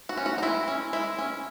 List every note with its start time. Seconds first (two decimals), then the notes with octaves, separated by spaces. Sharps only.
0.09 F#4
0.17 C#4
0.26 F#4
0.38 D#4
0.42 G#3 E4
0.68 C#4
0.93 G#3 E4
1.18 C#4